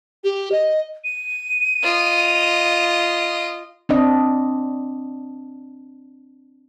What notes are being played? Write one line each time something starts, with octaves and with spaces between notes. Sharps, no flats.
G4
D#5
D#7
F4 D#5
C4 D4 D#5